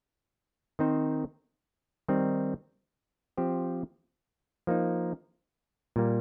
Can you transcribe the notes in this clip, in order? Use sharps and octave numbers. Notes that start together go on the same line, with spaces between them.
D#3 C4 D#4 C5
D#3 G3 C4 D#4
F3 C4 G4 C5
F3 A#3 D#4
A#2 G3 A#3